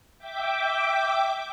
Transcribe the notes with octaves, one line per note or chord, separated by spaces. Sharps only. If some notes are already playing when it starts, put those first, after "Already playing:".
E5 G5 D6